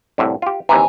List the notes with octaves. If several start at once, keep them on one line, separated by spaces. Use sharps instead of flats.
C2 A2 D3
F4 G4
D#2 C3 E3 G#5 A#5